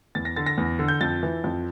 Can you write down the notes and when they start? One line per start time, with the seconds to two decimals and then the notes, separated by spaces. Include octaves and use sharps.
0.15 E2 A6
0.25 A#6
0.36 D3 A6
0.46 A#6
0.57 E2
0.79 D3
0.88 G6
1.01 F2 A6
1.23 E3
1.44 F2